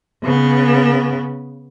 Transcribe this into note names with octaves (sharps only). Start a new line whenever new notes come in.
C#3 B3